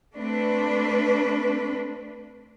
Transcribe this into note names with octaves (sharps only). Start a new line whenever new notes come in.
A3 C4 D4 B4